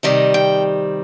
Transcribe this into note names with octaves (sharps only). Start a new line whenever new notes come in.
C3 D#3 G3 C4 D#5
G5